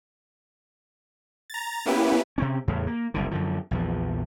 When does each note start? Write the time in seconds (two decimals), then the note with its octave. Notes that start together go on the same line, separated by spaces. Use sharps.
1.50 A#5 A6
1.86 A#3 B3 C#4 E4 G4 B4
2.38 C3 C4 C#4
2.68 E2 A2 C#3
2.87 A#3
3.14 F#1 C2 D3
3.31 F#2 D3 F3
3.71 A#1 E2 F3